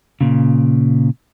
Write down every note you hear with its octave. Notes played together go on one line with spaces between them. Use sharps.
A#2 C#3